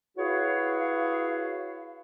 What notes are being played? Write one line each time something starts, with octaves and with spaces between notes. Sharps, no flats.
E4 F#4 G#4 B4 C#5 F5